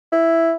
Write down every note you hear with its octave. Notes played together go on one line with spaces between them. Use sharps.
E4